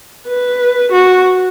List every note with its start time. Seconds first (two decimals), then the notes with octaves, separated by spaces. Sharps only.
0.28 B4
0.92 F#4